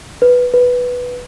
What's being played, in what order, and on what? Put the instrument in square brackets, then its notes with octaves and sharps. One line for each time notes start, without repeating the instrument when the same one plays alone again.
[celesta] B4
B4